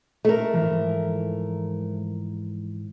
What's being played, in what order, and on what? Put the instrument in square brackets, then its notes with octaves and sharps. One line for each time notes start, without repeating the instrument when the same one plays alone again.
[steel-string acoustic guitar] A3 A#4
[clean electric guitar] G#2 E3 F3